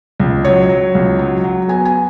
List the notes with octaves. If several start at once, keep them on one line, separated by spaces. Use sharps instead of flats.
C#2
F#3 C#5
F#3
C#2
F#3
F#3
B3 G#5
G#5